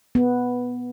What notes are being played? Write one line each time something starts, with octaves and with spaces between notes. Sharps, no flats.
B3